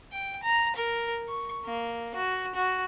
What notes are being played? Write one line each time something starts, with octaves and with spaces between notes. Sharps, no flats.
G5
A#5
A#4
C#6
A#3
F#4
F#4